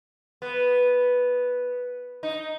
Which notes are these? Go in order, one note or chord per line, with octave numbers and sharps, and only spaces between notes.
B3
D#4